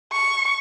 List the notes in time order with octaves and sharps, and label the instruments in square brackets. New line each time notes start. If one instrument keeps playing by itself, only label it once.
[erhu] C#6